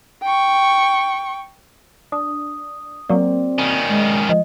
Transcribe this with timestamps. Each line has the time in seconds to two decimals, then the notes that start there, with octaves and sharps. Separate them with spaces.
0.23 G5 C#6
2.12 D4 D#6
3.09 F#3 A#3 C4 D5
3.58 D#3 C#4
3.88 G#3
4.29 F3 D#5